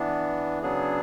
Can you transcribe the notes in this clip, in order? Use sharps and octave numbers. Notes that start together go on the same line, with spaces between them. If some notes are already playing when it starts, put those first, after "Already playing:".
Already playing: E3 B3 D4
C#3 F#3 B3 D4 G#4